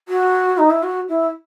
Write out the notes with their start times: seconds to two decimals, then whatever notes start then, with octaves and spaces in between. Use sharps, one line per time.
0.08 F#4
0.58 D#4
0.70 E4
0.83 F#4
1.09 E4